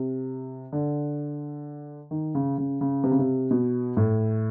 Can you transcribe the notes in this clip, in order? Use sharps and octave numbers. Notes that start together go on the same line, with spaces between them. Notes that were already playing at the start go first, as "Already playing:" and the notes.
Already playing: C3
D3
D#3
C#3
C#3
C#3
C3
C#3
C3
B2
A2